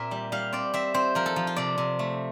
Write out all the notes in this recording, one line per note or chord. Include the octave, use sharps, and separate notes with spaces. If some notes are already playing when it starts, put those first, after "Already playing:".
Already playing: A#2 C4 A#4 E5
G3
G3 F5
C4 D5
C4 E5
C4 C5
F3 A#4
A4
F3
F4
C3 D5
C3
A3